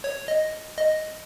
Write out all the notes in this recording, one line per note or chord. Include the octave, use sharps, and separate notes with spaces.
C#5
D#5
D#5